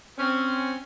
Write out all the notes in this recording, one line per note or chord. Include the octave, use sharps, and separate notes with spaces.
C4 C#4